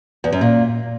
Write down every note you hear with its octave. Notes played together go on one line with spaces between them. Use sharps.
E2
F#2
A#2